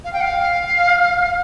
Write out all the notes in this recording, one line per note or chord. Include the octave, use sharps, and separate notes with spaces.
F5
G5
F5